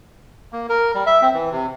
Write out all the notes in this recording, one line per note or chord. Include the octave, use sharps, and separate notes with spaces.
A#3
A#4
G3
E5
C4
E3
C3